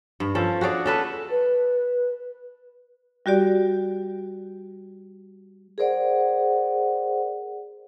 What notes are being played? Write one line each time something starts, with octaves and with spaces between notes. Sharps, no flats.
G2
F3 C#4 A4
F#4 G#4 C#5 D5
C#4 A4 B4
B4
G3 F#4 G4 D5
G#4 A#4 C5 D5 F#5